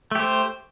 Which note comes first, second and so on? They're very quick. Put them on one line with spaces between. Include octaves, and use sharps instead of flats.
A3 G4 C5